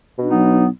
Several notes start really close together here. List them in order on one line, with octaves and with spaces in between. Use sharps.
B2 D4 D#4 B3 F#3